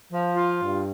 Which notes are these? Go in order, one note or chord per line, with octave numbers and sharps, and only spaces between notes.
F3
F4
G2